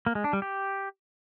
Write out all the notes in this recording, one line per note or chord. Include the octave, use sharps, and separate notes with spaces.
A#3
G#3
D4
G3
G4